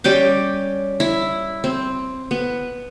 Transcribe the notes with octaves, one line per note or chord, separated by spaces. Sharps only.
G3 C#4 G5 D6
E4
C4
B3